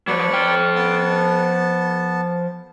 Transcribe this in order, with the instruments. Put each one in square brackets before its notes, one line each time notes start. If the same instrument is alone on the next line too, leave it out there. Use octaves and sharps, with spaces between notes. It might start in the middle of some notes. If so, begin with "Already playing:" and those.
[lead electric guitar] F3 F#3 [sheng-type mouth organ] B4 C#5 D5
[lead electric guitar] F3 G5
[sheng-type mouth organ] B3 A5